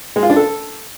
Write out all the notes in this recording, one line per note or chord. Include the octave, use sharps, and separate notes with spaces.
G#3
F4
D4
A4